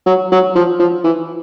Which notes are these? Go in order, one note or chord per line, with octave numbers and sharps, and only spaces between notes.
F#3
F#3
F3
F3
E3